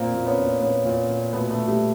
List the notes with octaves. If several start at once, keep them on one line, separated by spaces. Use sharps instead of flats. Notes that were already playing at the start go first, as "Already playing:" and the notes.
Already playing: A#2 A#3 C4
A#2
B3 C#4
A#2
A#2 B3 C#4
A#2
A#2
B2 A3 B3
A3 B3
B2
G3 A3